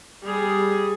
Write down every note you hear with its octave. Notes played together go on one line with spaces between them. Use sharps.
G3 G#4